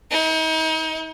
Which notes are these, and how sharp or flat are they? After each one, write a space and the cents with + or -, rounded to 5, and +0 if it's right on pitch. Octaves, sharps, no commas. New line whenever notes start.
D#4 +40